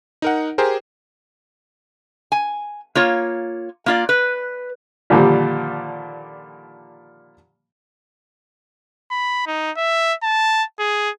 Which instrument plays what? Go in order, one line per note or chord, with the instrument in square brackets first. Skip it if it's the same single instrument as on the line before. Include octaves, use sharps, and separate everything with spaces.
[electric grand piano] D#4 A#4 F#5
G4 G#4 A#4 C5
[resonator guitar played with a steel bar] G#5
A#3 F4 C#5
A#3 F4 D5
B4
[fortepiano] A#2 D3 D#3 F3 G3 A#3
[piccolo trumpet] B5
D#4
E5
A5
G#4